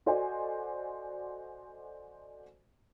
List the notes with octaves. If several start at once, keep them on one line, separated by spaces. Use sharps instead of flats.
F#4 A4 C5 D5 D#5 G#5